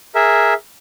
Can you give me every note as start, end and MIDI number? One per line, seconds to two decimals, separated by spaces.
0.15 0.54 68
0.15 0.54 70
0.15 0.54 76